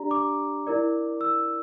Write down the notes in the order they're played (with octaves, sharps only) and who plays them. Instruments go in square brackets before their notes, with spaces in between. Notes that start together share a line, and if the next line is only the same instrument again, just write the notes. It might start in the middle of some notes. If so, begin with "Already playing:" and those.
Already playing: [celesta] D4 G4 D5 A#5
D6
E4 A#4 D5
E6